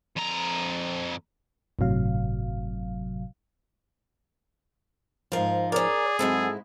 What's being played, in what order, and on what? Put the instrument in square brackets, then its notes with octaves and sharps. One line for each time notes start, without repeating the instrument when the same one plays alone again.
[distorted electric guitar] F2 A#5
[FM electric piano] G1 A2 C3 F#3 F5
[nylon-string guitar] G#2 F3 [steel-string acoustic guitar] A#4 F5
[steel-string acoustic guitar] C#4 A#4 [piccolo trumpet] G#4 [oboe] D5
[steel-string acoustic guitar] G#2 G#3 E4 [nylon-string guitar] F#3 C4 [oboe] A4